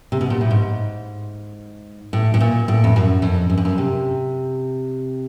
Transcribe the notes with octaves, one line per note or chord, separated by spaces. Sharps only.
C3
B2
A#2
A2
G#2
A2
A2
A#2
A2
F2
F#2
F2
F#2
G2
F#2
C3